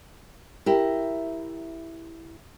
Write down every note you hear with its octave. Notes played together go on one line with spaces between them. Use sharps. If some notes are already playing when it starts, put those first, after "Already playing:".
E4 G4 A#4